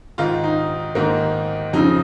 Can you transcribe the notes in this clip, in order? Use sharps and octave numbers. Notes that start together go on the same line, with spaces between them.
G#2 D#3 F4
D#4
G#2 D#3 A#3
F2 C#3 D#4